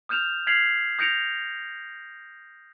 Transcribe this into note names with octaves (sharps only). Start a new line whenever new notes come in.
D#6 F6 G6 E7 F7
F6 G#6 B6 C7 F7 F#7
D#6 G6 A#6 C#7 D7 F7